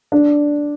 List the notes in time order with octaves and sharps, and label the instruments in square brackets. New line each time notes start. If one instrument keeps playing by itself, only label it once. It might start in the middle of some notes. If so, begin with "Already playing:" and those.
[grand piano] D4